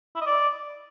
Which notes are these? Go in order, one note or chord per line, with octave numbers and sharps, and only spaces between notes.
E4
D#5
D5